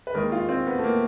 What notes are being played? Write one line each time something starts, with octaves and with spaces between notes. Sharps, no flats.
B4
D#2 D#3 G#3 A#4
F4
C4
B3
A3
A#3